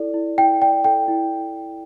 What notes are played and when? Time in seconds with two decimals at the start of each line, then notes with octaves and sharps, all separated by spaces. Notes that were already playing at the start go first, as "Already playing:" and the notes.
Already playing: E4 A4 D5
0.14 E4
0.38 E4 G5
0.61 D5 G5
0.84 A4 G5
1.08 E4